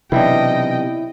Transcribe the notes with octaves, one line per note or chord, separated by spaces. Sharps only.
B1 C3 E3 D4 E4 D#5 G5